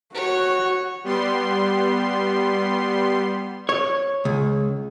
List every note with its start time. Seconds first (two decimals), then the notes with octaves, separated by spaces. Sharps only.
0.14 F#4 C#5
1.04 G3 B3 C6
3.69 C#5
4.25 C#2